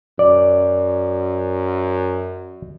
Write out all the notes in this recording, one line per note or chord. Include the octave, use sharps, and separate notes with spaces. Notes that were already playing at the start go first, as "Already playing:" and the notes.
F#2 D5